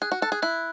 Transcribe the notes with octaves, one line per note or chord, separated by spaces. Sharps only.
G#4 F#6
F#4
A4 F#6
G#4
E4 F#6